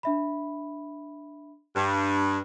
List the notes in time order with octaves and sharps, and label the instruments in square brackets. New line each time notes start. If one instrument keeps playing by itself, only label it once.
[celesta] D4 E5 B5
[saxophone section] G2